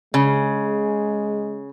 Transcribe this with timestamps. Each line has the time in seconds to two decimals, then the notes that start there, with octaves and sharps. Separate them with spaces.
0.14 C#3 G#3